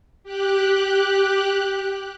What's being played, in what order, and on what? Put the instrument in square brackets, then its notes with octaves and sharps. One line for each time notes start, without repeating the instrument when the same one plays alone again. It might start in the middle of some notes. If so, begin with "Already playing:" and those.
[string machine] G4 F#6